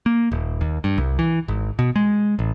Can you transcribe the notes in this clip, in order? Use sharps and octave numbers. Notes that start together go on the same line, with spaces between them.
A#3
D#1
D#2
G2
C2
E3
G#1
B2
G#3
A1